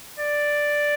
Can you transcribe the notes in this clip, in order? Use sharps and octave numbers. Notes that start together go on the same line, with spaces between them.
D5